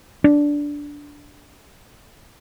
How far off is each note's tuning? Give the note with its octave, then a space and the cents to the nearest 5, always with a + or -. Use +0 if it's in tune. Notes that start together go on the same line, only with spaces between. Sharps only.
D4 -10